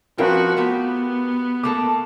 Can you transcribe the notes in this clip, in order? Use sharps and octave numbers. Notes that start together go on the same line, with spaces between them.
F3 C4 C#4 F4 F#4 A#4 B4 G5
A3 B3 F#4 G4
A3 A#3 A4 D6